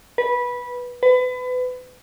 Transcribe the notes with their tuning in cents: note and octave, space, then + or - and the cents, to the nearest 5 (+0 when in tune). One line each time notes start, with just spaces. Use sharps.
B4 -15
B4 +30